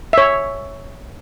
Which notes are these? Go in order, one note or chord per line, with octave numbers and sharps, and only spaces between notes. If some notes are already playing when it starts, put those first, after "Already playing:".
C#5 E5